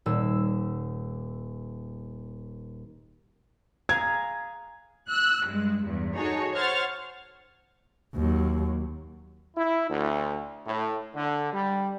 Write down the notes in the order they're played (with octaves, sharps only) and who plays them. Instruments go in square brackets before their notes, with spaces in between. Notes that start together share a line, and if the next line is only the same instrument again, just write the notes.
[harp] D#1 E6
[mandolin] G#4 F5 A#5 [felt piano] G#6
[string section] E6 F#6
G2 G#3
E2 G2
D#4 F#4 G#4 A4 C#5
C5 C#5 F#5 F6 A6
[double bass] D#2 F#3
[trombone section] E4
D2
A2
D3
G3